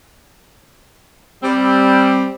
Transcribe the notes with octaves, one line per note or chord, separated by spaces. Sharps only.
G3 C4